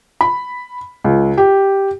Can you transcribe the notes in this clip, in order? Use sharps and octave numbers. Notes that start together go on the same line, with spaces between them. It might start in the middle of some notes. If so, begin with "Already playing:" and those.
B5
C#2
G4